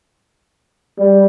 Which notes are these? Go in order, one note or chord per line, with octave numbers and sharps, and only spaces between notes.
G3